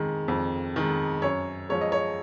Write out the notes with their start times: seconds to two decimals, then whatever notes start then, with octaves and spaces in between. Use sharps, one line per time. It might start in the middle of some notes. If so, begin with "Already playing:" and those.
Already playing: F2 D#3 G#3
0.28 F2
0.76 D#3 G#3
1.22 F#2 C#5
1.69 F3 G#3 C#5
1.81 D#5
1.92 C#5